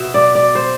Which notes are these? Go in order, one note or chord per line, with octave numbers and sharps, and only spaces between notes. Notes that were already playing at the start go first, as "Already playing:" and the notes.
Already playing: B2 E5
D5
D5
C5